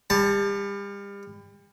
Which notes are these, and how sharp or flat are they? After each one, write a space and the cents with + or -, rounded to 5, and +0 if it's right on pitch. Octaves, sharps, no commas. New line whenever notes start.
G3 +35 A5 +0